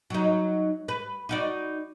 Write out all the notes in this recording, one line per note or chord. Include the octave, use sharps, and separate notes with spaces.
F#3 D#4
B4
D#4 F#4 D5